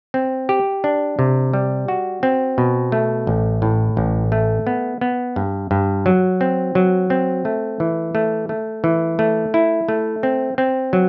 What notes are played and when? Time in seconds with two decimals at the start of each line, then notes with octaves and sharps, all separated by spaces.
0.14 C4
0.49 G4
0.84 D4
1.19 C3
1.53 G3
1.88 F#4
2.23 C4
2.58 B2
2.92 A3
3.27 A1
3.62 A2
3.97 A1
4.32 A3
4.67 B3
5.01 B3
5.36 G2
5.71 G2
6.06 F#3
6.41 C4
6.75 F#3
7.10 C4
7.45 A3
7.80 E3
8.15 A3
8.49 A3
8.84 E3
9.19 A3
9.54 E4
9.89 A3
10.23 C4
10.58 C4
10.93 F#3